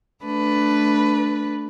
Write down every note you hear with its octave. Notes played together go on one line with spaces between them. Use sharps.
A3 D4 B4